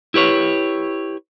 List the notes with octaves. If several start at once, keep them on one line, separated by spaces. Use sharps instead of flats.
E4 G4 B4 C#5